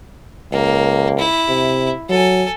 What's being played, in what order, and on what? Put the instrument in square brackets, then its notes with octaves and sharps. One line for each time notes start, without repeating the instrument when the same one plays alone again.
[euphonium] C#2 [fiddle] A#3
[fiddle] E4
[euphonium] C3
[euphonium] F#3 [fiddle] A4 G#5